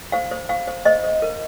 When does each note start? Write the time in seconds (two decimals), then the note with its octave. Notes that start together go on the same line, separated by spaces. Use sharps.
0.12 C5 F5
0.31 C5
0.49 C5 F5
0.68 C5
0.85 C5 D#5
1.04 C5
1.22 A#4